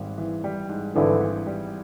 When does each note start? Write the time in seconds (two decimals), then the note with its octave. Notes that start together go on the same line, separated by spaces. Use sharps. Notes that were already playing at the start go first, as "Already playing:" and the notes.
Already playing: G#1 G#2 G3
0.18 E3
0.44 G3
0.69 G#2
0.95 G#1 D3 E3
1.21 E3
1.47 G3